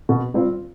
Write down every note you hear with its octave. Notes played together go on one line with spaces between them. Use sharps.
B2
G3 C4 F4